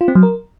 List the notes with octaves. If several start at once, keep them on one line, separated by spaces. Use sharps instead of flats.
F4
C4
F#3
A#4